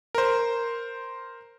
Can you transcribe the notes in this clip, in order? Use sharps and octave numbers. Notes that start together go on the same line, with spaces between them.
A#4 C5